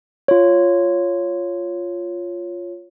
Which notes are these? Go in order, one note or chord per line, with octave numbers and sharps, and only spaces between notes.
F4 C#5